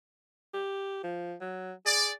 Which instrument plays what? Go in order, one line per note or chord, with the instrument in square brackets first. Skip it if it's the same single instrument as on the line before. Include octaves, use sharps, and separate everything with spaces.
[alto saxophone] G4
F3
F#3
[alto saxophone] G#4 [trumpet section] D5